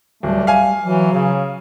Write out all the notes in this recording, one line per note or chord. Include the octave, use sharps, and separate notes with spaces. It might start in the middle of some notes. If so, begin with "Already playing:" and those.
D1 G3 A3
F5 G#5
E3 F#3
C#3